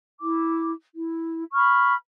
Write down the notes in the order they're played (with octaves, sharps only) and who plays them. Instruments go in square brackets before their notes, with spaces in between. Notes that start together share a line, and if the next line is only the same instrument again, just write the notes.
[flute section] E4 D6
E4
B5 C#6 F6